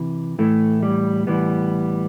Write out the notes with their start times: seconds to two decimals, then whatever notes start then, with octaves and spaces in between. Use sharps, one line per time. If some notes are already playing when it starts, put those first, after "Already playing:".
Already playing: C3 E3
0.39 A2 E3 A3
0.82 G3
1.27 A2 E3 G3 B3